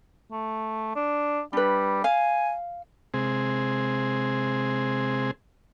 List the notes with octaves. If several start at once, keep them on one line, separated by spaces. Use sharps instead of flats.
A3
D4
G3 D4 B4
F5 G#5
C3 G#3 C4 G#4